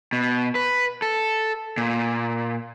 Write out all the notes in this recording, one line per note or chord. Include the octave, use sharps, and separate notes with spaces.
B2
B4
A4
A#2